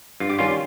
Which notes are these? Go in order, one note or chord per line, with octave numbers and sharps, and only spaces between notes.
G2 F4
G4
D#3 G3 C#4 F4